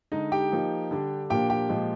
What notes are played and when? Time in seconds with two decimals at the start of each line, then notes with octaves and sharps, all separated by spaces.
0.12 D3 G#3 D#4 D#5
0.32 G4 G5
0.52 F3 A#3 D#4
0.91 D3 G3 D4
1.30 A#2 F3 A#3 D4 G4 G5
1.50 G4 G5
1.69 A#2 F3 G#3